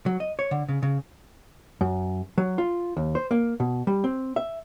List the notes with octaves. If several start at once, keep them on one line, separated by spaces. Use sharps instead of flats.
F#3
D#5
C#5
D3
C#3
C#3
F#2
F#3
F4
D#2
C5
A#3
B2
G3
C4
E5